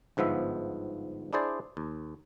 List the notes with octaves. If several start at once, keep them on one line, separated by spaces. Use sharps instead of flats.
G1 G#2 F3 B3 E5
D4 E4 G#4 C5 D5
D#2